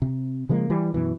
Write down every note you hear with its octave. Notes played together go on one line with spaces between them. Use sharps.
C3
C#3 F3 G#3 A#3
E3 G3
F#2 B2 E3